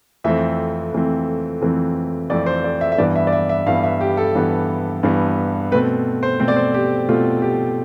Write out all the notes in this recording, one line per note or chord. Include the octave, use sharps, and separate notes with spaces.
F2 E3 A3 C4 E5
F2 E3 A3 C4
F2 E3 A3 C4
F2 E3 A3 C4 D5
C5
D5
E5
E5
G2 E3 B3 D5
E5
D5
E5
E5
G2 E3 B3 F5
E5
G4
A4
G2 E3 B3
G2 E3 B3
B2 A3 C4 B4
C5
B2 A3 C4 C5
D5
C5
G4
B2 A3 C4 F4
G4